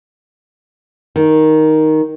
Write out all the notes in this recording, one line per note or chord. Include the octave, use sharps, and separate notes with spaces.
D#3